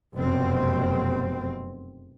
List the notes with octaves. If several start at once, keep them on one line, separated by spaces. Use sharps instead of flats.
F1 F#2 B2 C4